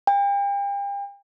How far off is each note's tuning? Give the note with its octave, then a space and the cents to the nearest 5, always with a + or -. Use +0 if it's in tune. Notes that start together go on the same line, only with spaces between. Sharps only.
G5 +40